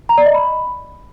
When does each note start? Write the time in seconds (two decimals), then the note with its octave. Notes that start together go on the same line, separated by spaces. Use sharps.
0.09 A#5
0.18 D5
0.26 D#5
0.34 B5